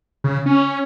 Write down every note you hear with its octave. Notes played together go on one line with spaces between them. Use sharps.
C#3
C#4